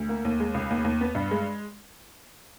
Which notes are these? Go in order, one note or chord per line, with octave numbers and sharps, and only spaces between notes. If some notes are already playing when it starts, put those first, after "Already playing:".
Already playing: D2
A#3
D#2
G#3
C#2
D#2
D#2
B3
G2
G#3